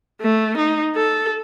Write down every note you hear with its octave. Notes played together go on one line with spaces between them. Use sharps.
A3
D#4
A4